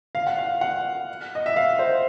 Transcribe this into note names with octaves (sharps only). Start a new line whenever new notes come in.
F5
F#5
F5
F#5
D#5
E5
F5
C5